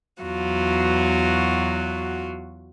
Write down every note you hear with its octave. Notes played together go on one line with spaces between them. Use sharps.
E2 F#3 F4 F#4